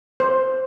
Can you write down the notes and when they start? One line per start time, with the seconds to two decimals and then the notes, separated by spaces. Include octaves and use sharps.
0.20 C5